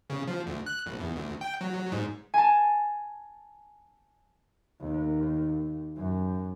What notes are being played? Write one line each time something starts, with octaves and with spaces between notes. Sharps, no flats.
C#3
F3
D2
F#6
A#1
E2
D2
G5
F#3
G#2
G#5 A5
D#2
F#2